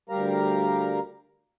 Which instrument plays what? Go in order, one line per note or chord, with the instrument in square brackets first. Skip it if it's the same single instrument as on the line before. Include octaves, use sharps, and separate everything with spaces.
[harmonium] D2 G3 G4 A#4 F5 A#5